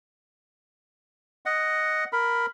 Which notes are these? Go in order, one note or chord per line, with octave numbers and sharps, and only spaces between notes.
D#5 F#5
A#4 B5